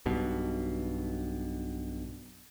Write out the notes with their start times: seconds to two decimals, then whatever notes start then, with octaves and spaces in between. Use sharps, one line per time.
0.06 B1 G2 B2